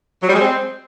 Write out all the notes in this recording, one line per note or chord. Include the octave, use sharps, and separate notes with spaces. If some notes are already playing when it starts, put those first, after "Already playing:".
F#3
G3
G#3
C4